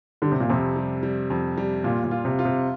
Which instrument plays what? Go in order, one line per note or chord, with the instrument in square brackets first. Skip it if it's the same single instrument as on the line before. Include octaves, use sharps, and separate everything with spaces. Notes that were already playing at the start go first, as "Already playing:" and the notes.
[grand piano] D3 [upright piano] G3
[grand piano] C3
A#2
[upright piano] F2 [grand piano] C3
[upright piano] G3
G3
F2
G3
[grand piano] A#2 [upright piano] F4
[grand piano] A#2
[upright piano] F4
[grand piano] C3
[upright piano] F4
[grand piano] C3